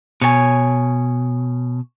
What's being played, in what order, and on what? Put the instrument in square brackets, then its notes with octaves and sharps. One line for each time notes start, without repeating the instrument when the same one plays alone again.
[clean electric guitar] B2 [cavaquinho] C#5 G#5